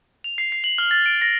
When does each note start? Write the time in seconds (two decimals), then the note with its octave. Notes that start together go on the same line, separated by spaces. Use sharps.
0.24 F7
0.38 C7
0.52 C7
0.64 F#7
0.78 F6
0.91 A6
1.06 D7
1.22 A#6